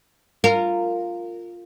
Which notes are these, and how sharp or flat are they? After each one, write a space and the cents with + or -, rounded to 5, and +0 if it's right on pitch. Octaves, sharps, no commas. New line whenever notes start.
F4 +0 A#4 -20